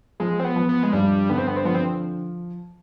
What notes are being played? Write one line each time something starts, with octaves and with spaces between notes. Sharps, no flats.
F3 G#3
C4
B3
F3
B3
G#3
G2 G3
D3 B3
C4
B3
C4
F3 B3
C4